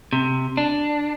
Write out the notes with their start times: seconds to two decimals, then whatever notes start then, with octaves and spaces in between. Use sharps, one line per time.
0.13 C3
0.57 D4